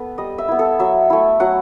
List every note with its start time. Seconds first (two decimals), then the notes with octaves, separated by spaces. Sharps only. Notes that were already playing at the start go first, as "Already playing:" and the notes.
Already playing: B3 A4 B4
0.18 G3 D#5
0.38 E5
0.48 B3 E4
0.59 A4
0.79 F#3 E5
1.10 A3 E4
1.40 F#3 F#5